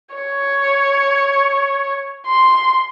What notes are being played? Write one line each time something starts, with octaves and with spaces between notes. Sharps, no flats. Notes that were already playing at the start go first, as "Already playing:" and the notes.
C#5
C6